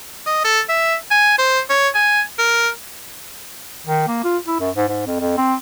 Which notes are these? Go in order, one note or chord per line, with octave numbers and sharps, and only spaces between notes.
D#5
A4
E5
G#5
C5
C#5
G#5
A#4
D#3
A#3
F4
E4
F#2
G#2
G#2
F2
F2
C4